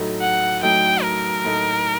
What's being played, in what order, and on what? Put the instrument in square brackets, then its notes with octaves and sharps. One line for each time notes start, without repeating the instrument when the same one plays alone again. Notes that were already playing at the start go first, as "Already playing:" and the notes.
Already playing: [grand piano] A2 F#3 A3 D#4 A4
[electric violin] F#5
[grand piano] A2 F#3 A3 D#4 A4 [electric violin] G5
[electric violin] A#4
[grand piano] A2 F#3 A3 D#4 A4